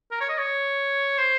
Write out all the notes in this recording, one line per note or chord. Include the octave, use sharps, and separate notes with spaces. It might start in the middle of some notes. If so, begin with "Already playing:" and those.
A#4
C#5
D#5
C#5
C5